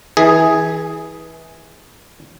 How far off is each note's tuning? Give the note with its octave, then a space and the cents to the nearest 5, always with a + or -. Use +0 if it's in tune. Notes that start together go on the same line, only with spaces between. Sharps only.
E3 -25 G#4 +0